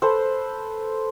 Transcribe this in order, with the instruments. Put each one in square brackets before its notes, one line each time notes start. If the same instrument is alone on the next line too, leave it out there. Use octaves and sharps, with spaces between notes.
[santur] A4 B4 C5